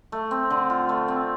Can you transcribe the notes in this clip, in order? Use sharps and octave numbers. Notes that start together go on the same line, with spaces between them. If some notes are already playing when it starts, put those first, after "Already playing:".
A3
C4
D3
F4
A3
C4